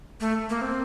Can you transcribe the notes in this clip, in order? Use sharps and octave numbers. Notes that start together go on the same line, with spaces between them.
A3
A#3
C4